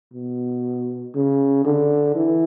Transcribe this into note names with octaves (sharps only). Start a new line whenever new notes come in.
B2
C#3
D3
E3